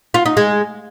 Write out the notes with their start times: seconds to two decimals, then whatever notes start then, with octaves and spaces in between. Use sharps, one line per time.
0.14 F4
0.26 D#4
0.37 G#3